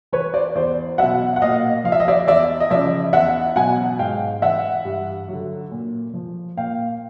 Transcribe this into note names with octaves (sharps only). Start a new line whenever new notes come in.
E3 B4 C#5
C5 D5
E2 C5 D5
B2 F#3 E5 F#5
F#5
A#2 D#5 F5
F3 F5
E5
D#5
D5 E5
E2 D5 E5
D#5
C#3 F3 D5 E5
E2 E5 F#5
B2 F#3 F#5 G#5
G#2 F5 G5
E3 E5 F#5
G2
D3 F#3
A#2
F3
A#2 F5 G5